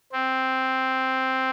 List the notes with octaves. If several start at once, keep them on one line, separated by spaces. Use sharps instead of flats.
C4